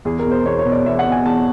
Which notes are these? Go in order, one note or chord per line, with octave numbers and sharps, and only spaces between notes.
E2 G#4
A#4
B2
C5
E2 C#5
C#5
B2
D5
E2 E5
F#5
B2
G#5
E2 A5